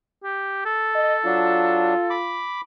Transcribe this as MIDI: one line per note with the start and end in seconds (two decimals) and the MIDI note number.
0.23 0.64 67
0.65 2.15 69
0.95 1.15 75
1.25 1.94 54
1.25 1.94 62
1.25 2.47 65
2.10 2.61 83
2.10 2.61 86